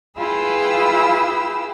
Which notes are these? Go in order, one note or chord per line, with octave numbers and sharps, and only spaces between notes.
E4 F4 G#4 B4 G5 E6